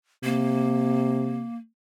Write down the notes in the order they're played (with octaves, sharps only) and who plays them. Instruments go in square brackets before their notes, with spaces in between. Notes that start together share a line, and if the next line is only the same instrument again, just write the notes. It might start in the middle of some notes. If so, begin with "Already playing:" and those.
[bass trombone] C3 [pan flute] A#3